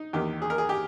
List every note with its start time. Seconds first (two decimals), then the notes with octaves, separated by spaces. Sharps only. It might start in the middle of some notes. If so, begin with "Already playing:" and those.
Already playing: D#4
0.13 E2 D#3 A#3 G4
0.42 G#4
0.50 A#4
0.58 G#4
0.69 G4